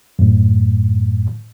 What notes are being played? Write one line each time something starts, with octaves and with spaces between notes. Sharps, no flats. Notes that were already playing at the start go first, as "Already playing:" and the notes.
F#2 A2